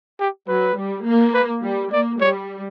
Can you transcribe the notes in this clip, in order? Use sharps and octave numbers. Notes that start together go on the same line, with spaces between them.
G4
F#3 B4
G3
A#3
B4
G3
A#3 D5
G3 C#5